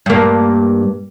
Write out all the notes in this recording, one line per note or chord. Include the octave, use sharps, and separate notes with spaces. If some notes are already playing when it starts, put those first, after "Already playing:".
G2 A#3